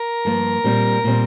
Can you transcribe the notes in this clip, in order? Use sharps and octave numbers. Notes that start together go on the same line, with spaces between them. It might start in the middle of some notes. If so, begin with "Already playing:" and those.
Already playing: A#4
G2 F3 A#3
A#2 G3 C4
A#2 G3 C4